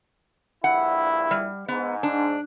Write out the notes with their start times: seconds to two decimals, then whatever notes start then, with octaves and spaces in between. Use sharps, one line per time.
0.64 A#1 G2 E4 F#5
1.31 G3
1.68 G#2 B3
2.03 D4